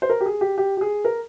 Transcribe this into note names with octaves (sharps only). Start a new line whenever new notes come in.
C5
A#4
G4
G#4
G4
G4
G4
G#4
A#4